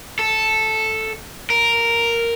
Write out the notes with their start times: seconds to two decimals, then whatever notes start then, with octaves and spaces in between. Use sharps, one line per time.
0.19 A4
1.50 A#4